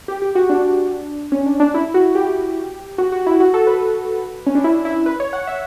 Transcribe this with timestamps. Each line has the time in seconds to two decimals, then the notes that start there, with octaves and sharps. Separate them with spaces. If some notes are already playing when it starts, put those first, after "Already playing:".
0.08 G4
0.22 G4
0.35 F#4
0.50 D4
1.32 C#4
1.46 D4
1.60 D4
1.74 E4
1.94 F#4
2.15 G4
2.98 F#4
3.12 F#4
3.27 E4
3.40 F#4
3.54 A4
3.67 B4
4.47 C#4
4.55 D4
4.64 E4
4.85 E4
5.06 B4
5.20 C#5
5.33 F#5
5.47 E5